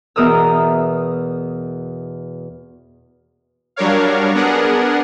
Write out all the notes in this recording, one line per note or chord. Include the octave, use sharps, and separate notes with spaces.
E2 B2 A#4 D#6 E6
F#3 G3 D4 A#4 C#5 F5
B3 D4 G#4 A#4 F#5